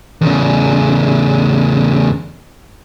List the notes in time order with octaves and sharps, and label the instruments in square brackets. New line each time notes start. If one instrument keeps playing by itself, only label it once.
[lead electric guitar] E2 C#3